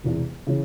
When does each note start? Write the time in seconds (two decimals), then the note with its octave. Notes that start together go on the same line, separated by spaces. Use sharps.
0.03 E1 E2 C3
0.47 C#3 E3